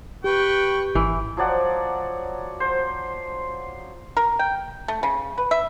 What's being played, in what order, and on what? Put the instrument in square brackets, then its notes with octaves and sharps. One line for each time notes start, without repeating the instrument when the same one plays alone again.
[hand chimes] G4 [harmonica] B4 G5 C#6
[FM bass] G#1 [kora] E3
[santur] F3 F#3 D5 F#5
C5
[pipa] A#4
G5
A3
C#3
B4
E5